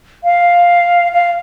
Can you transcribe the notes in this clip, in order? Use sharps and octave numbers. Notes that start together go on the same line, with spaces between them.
F5
F5